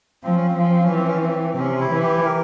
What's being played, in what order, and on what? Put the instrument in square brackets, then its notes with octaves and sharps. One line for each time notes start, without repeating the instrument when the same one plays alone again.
[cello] F3 [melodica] C4
[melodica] C#4
C4
[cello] F3 [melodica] C#4
[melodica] C4
C#4
[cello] E3 [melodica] C4
[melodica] C#4
C4
[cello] C3 [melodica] C#4
[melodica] E4
[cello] E3
[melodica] E4 G4
G4 A#4